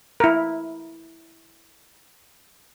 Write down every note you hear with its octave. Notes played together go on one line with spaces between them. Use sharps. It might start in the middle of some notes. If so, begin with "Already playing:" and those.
E4 A#4